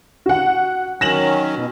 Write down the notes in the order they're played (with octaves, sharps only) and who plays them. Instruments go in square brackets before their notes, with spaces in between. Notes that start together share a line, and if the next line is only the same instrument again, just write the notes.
[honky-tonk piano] F#4 F#5
[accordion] D#3 F#3 C#4 [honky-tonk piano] A#6 E7 F#7
[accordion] B2